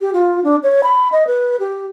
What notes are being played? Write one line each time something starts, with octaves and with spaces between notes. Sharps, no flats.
G4
F4
D4
C#5
B5
D#5
B4
G4